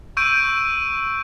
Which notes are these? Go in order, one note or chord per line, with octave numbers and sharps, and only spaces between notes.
C#6 E6 G6 D7 D#7